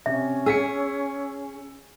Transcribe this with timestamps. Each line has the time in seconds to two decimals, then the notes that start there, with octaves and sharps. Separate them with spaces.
0.06 C3 C#4 E5
0.46 G#4 E6 B6 C#7